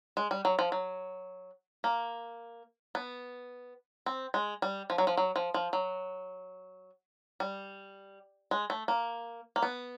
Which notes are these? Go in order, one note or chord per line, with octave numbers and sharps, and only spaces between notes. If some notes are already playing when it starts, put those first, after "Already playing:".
G#3
G3
F#3
F3
F#3
A#3
B3
C4
G#3
G3
F3
F#3
F3
F#3
F3
F3
F#3
G3
G#3
A3
A#3
A#3
B3